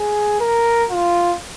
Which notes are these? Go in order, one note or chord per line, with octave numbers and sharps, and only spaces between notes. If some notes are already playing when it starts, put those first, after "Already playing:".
Already playing: G#4
A#4
F4